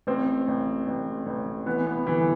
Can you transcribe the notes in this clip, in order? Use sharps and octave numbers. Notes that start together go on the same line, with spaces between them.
A1 C4
A1
A1
A1
E3 B3
B3
G1 E3